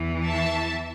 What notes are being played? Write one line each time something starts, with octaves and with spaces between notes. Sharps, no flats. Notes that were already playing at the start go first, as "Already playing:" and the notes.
Already playing: E2 E3
E5 A5